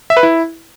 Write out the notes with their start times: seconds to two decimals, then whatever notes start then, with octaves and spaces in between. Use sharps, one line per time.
0.10 E5
0.17 B4
0.23 E4